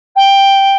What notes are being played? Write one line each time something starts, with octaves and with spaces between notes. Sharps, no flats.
G5